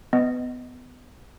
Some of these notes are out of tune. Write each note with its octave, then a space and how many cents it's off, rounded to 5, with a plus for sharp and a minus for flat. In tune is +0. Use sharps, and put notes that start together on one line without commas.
B3 +20 D#5 +0